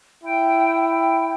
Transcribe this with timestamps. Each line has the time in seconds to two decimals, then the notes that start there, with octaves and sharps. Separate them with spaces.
0.23 E4 G5
0.85 G5